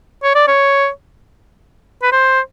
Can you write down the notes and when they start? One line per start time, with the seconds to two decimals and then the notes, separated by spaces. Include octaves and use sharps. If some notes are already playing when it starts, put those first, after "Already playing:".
0.23 C#5
0.35 D5
0.48 C#5
2.03 B4
2.12 C5